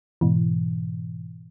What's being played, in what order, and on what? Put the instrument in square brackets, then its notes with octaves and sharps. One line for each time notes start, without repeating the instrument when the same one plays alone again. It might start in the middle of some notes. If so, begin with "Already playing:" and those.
[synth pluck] G#2 B2 E3